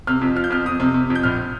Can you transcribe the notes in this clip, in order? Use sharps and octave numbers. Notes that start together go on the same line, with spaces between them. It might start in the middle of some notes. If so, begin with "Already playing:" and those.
C3 F6
F2
F3 F6
G6
F2 F6
F2 D#6
C3
C3
F2
G6
A#1 F6